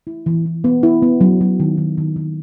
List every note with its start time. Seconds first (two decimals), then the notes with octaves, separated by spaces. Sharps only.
0.07 E4
0.26 E3
0.46 E3
0.64 B3
0.83 E4
1.02 B3
1.21 F#3
1.41 F#3
1.60 D#3
1.77 D#3
1.98 D#3
2.16 D#3